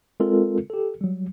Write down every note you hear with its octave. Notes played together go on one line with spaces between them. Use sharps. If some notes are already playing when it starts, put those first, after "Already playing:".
G#3 C4 F4 A4 A#4
G4 A4
F#3 G3